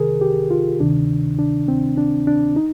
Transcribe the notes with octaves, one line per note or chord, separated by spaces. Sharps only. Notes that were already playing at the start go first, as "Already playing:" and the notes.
Already playing: C2 C3 D#3 G#4 A#4
G4
F4
D2 C3 D#3 D4
D4
C4
D4
D4
D#4